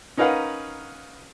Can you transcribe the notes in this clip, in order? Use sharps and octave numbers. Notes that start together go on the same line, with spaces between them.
C#4 D#4 A#4 B4 F5 F#5